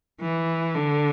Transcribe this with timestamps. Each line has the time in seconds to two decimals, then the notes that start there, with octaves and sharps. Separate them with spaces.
0.21 E3
0.75 D3